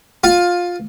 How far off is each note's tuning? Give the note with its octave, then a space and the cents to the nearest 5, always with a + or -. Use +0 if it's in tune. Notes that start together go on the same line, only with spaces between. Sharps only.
F4 +15